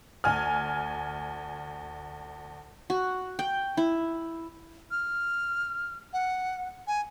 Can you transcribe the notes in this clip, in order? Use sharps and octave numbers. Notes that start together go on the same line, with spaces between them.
D2 G#5 F6
F#4
G5
E4
F6
F#5
G#5